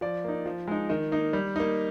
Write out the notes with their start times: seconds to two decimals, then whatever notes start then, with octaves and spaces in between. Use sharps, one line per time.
0.01 F3 D5
0.24 A#3 D#4
0.46 F3
0.68 G#3 D#4
0.89 D#3 D#5
1.12 A#3 D#4
1.33 G3
1.56 A#3 D#4